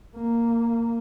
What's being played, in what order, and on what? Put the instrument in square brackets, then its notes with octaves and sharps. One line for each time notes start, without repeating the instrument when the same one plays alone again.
[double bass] A#3